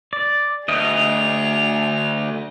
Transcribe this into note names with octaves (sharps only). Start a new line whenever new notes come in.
D5
D2 G#4 D#5 F7